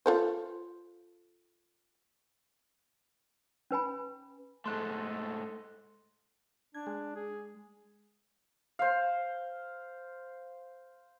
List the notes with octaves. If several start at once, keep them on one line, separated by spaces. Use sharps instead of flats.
F4 A4 C5
C#4 B4 G#5 B5
G#2 A3 A4 D#5 C6 F#6
D4 G#6
G#3
G#4
C5 F5